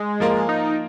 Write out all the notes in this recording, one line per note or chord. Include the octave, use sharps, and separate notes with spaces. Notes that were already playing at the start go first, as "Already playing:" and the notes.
Already playing: G#3
F3 A#3 F4 A#4
D#4